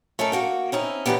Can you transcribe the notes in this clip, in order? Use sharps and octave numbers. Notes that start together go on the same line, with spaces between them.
A3 C#4 D#4 A4 A#4
A#3 F#4 G5
C4 C#4 D#4 E4
A2 D3 E3 B3 D4 G4